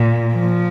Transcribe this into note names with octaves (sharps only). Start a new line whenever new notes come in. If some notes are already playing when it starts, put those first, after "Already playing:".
Already playing: A#2
F3